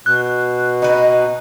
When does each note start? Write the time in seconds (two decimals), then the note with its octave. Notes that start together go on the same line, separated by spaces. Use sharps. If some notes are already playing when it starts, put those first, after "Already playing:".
0.06 B2 F#6
0.82 D#4 B4